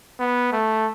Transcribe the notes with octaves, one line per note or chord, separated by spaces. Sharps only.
B3
A3